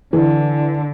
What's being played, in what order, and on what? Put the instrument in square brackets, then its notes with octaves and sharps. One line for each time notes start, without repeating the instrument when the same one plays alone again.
[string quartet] D3 [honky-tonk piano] E3